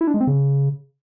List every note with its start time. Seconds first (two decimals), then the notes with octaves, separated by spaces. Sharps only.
0.01 E4
0.07 D4
0.14 G#3
0.21 C4
0.27 C#3